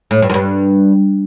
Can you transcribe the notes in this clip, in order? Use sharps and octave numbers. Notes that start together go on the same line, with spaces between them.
A2
G2
F#2
G2